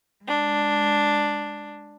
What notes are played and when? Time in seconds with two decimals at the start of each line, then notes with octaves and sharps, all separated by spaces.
0.23 G#3 D4